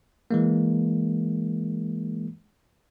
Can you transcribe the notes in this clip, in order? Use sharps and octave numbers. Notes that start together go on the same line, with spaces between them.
E3 G#3 A#3